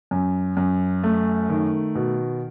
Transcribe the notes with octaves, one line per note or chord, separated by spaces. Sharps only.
F#2
F#2
A3
D#3
B2